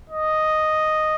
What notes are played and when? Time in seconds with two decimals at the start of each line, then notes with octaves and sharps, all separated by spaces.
0.10 D#5